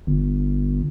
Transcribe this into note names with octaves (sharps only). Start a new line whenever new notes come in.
G1